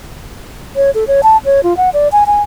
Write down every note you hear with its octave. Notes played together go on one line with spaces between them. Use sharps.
C#5
A4
C#5
A5
C#5
F4
F#5
D5
G#5
G#5